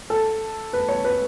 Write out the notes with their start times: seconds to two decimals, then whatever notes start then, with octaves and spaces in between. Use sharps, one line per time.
0.10 A4
0.73 B4
0.88 C#5
1.05 B4